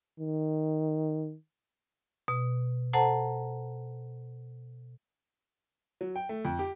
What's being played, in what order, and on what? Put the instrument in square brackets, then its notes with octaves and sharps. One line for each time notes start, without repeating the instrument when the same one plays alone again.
[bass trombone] D#3
[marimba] B2
A4 C5 F#5 A5 A#5
[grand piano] F#3
G5
A3
F2
G4